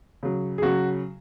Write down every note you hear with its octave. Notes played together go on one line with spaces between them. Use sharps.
C#3 F#3
G#4
C#3 F#3 F#4